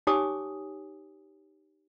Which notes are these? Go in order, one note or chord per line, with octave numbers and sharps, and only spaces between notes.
D#4 G4 C#5 G#5 D6 D#6